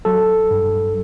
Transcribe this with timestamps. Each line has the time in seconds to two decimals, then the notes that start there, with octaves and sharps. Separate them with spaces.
0.05 F#3 A4
0.51 G2